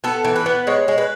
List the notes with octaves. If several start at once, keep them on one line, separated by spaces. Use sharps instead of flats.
B3 A4
E3
B4
B3
G#3 C#5
G#3
B4